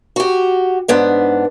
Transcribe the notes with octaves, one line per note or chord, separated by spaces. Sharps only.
F#4 G4
G#2 B3 D4